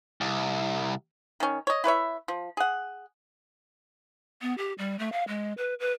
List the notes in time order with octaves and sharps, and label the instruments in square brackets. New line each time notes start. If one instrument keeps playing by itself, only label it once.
[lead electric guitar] C2
[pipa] D#3 C#4
C#5 D#5
E4 B4 C#5 E5
F3
G#4 F#5
[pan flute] B3
G4
G3
A3
F5
G#3
B4
B4